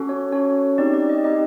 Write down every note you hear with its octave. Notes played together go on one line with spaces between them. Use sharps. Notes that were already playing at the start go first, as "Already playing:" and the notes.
Already playing: C#4 F#4 A4
C#5
C#4 F#4 A4 C#5
C4 D#4 G4 D5
D5
D#5
C4 D#4 G4 D#5